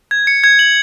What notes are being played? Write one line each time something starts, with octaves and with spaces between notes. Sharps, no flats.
G#6
C#7
G#6
F#7